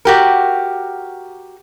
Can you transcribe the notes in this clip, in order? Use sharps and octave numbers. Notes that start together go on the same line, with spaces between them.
F#4 G4 A#4